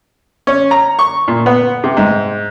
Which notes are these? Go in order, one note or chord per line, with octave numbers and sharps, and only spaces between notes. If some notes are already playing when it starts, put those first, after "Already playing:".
C#4
A#5
C#6
A#2
B3
C3
G#2